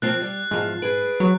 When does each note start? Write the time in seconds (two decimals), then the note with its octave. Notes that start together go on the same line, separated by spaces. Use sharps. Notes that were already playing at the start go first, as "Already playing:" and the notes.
0.02 F3 A#3 C4 F#6 A6 C7
0.22 G3
0.51 E2 G#2 F3
0.82 G#4 B4 D7
1.20 F#3